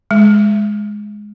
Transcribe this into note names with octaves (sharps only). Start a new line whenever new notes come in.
G#3